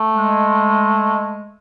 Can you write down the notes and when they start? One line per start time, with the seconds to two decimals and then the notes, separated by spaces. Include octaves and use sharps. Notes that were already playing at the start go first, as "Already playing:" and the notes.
Already playing: A3
0.14 G#3